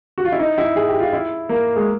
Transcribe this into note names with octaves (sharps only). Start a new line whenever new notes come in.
F#4
F4
E4
D#4
E4
G#4
G4
F4
E4
A#3
G#3